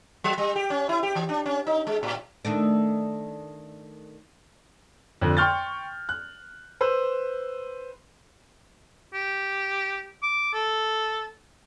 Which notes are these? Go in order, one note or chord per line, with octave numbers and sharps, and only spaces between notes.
F#3
G3
G4
C#4
E4
G4
E3
D4
C#4
D#4
G#3
A2
D#3 A3 D4
F2 D3
G5 C6 C#6 F6 G6 A6
F#6
B4 C5 E6
G4
D6
A4